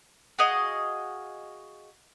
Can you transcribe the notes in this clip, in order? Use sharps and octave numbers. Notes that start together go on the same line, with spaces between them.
F#4 G#4 D#5 F5